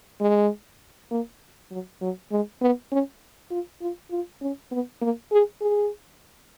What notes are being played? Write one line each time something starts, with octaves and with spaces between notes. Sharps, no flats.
G#3
A#3
F#3
F#3
G#3
B3
C#4
F4
F4
F4
C#4
B3
A#3
G#4
G#4